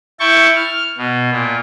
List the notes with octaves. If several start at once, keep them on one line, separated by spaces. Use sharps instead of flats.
E4 G5 A5 C#6
F6
B2
A#2